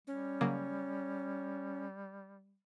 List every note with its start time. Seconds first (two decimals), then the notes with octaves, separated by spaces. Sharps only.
0.07 G3 C#4
0.41 C#3 F#3 A#3